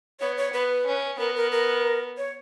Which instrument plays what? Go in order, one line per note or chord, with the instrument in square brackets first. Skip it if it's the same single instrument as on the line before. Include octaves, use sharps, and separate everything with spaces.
[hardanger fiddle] B3 [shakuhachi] C#5
[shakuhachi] C#5
[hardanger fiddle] B3 [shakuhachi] B4
[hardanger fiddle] C#4
[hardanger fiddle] B3 [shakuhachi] A#4
[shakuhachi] A#4
A#4
C#5